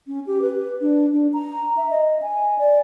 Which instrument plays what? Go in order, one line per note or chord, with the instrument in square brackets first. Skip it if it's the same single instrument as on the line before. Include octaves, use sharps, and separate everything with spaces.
[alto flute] C#4
G4
B4
D4
D4
A#5
E5
D#5
G#5
D5